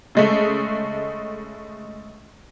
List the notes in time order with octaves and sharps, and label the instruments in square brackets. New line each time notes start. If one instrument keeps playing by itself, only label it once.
[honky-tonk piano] C#3 G#3 A3